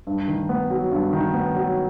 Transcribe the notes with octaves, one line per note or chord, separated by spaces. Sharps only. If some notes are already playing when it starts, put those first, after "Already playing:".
G2
D#3
B3
F#3
G2
D#3
B3
F#3